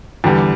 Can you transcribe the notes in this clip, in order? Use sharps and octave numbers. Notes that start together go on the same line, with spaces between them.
E2 D3 G3